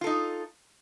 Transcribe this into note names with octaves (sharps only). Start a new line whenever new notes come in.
D#4 F4 A4